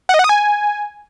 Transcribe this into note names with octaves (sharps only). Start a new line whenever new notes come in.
F#5
D#5
F#5
D#6
G#5